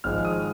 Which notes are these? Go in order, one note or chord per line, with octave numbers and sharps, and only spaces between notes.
G#1 G#2 F3 G#3 F6
D#6